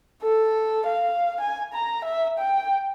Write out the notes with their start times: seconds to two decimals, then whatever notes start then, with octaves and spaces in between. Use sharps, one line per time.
0.23 A4
0.86 F5
1.41 G#5
1.73 A#5
2.05 E5
2.39 G5